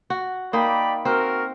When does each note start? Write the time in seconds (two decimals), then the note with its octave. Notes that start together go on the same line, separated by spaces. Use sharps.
0.10 F#4
0.53 A#3 D#4 D5 G5 B5
1.05 C4 F#4 A#4